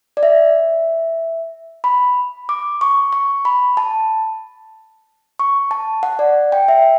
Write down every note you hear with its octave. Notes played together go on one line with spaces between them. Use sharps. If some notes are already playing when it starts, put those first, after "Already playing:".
D5
E5
B5
D6
C#6
C#6
B5
A5
C#6
A5
F#5
D5
G5
E5